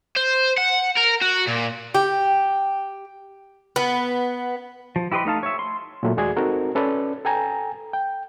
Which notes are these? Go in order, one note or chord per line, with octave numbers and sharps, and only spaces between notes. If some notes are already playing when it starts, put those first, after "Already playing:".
C5
F#5
A#4
F#4
A#2
G4
B3
F3
E4 G4 B4 D#5 C6
A3 D#4 F5 A5
C#5 E5
C6
A#2 F#3 A3
D#2 G#3 F#4 G#4 D5 G#6
C4 D#4 F#4 A4 A#4
C#4 A4 B4 D5
A4 G5 G#5 A#5
G5